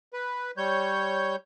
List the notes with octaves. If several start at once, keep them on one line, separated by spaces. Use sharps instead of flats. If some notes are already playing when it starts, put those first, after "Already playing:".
B4
G3 C#5 G6